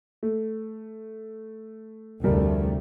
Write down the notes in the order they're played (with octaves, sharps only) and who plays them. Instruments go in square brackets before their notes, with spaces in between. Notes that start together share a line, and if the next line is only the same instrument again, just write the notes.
[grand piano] A3
[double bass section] F1 D2 A3 [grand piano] G3 A#4